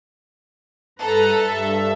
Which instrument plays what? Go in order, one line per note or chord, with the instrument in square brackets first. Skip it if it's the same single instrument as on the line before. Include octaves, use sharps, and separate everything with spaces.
[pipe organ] G2 B4 A#5 [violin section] A4
[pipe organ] G2 E5